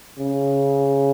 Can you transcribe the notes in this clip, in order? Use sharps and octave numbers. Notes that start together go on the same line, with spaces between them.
C#3